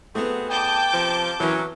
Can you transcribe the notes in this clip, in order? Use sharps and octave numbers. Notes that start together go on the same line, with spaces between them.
A3 B3 C4 F#4 G#4
E2 D#5 G5 A5 D6 G6
C3 F3
E3 F#3 C#4 E4 A#4